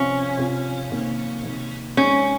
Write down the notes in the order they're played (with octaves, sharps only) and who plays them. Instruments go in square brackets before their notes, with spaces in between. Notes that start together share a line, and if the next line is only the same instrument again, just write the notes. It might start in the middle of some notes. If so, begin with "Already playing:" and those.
Already playing: [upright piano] C3 F3 C4 F4 [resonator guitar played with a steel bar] C#4
[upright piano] C3 F3 C4 F4
C3 D#3 A#3
C3 D#3 A#3
[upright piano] G#3 C4 D#4 [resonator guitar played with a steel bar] C#4